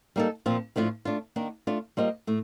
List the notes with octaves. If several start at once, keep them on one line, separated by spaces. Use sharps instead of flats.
G3 A#3 D#4 A4
A#2 F3 C4 F4
A2 F3 A3 D4 F4
A3 D4 F4
D#3 A#3 D4
A3 D4 F4
G3 A#3 F4 C5 D#5
A2 A3